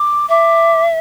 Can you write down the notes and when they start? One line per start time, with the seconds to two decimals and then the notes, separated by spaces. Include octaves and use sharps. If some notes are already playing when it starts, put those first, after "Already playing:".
Already playing: D6
0.29 E5 D6